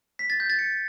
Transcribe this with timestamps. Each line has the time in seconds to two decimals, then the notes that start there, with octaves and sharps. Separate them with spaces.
0.19 B6
0.30 A6
0.40 G6
0.50 A6
0.59 C#7